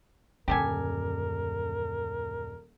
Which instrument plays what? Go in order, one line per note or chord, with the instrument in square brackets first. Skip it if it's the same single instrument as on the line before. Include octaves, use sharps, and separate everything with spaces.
[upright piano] D#1 [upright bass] F#2 D3 [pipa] G4 A4 G#5 [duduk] A#4